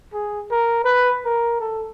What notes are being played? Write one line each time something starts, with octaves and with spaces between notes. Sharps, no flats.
G#4
A#4
B4
A#4
A4